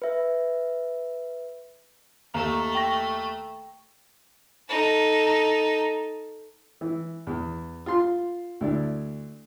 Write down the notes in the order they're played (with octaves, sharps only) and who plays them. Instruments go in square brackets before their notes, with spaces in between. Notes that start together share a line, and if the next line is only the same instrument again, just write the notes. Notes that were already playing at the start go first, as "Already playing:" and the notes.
[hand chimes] B4 E5
[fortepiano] D#2 [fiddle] A3 [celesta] A#5
[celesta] G5 C#6 A#6
[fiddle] D#4 A4
[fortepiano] E3
E2
F4 C6
D2 E4 D5